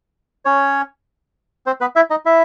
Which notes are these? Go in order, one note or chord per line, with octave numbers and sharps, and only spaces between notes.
C#4 C#5
C4 C5
B3 B4
E4 E5
D#4 D#5
E4 E5